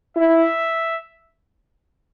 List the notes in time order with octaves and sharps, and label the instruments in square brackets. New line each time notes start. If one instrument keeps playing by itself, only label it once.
[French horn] E4 [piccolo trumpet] E5